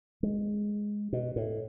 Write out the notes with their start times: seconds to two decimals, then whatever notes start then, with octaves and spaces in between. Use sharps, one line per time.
0.23 G#3
1.13 B2
1.36 A2